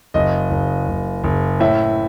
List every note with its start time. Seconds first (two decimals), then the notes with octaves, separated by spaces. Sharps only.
0.14 F#1 D#5
0.51 F#1
0.88 F#1
1.24 F#1
1.60 A2 E5